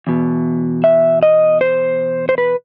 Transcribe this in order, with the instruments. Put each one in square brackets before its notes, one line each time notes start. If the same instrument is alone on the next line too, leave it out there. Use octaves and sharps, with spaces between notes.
[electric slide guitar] E2 B2
E5
D#5
C5
C5
B4